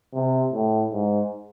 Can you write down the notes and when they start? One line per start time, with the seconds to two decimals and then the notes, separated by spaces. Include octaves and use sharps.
0.14 C3
0.53 A2
0.92 G#2